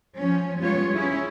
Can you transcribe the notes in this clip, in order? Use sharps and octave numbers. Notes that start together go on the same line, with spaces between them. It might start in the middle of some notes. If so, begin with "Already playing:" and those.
F3 C#4
G3 G#3 B3 F4 C#5
C#4 E4 G#4